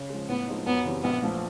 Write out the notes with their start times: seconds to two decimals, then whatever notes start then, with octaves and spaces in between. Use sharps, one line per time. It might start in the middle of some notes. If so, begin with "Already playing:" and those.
Already playing: C#3
0.10 F3 G#3
0.28 A2 B3
0.48 F3 G#3 C4 D#4
0.66 F#2 B3
0.85 C#3 E3 G3 C4
1.03 A#1 B3
1.22 A#2 F3 A3